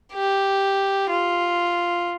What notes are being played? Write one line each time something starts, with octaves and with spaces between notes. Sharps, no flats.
G4
F4